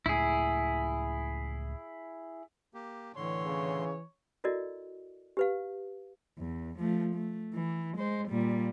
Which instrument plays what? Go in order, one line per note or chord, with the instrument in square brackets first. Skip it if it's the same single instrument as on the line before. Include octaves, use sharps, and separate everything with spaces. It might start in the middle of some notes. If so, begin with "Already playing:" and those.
[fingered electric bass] C#2 A2 [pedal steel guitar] E4 G#4
[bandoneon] A#3 G4
[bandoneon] A2 D3 C6 [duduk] E3 [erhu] C#5
[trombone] C#3
[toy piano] E4 F#4 A4 A#4 D5 D#5
G4 B4 F5
[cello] E2
F3 A3
A3
E3
G#3 C5
A#2 G3